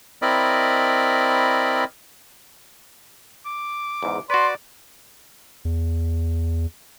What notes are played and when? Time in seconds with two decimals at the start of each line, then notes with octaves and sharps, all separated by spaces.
0.22 C4 E4 A#4 D5 D#5 B5
3.46 D6
4.03 E2 G#2
4.30 F#4 B4 D5 C6
5.65 E2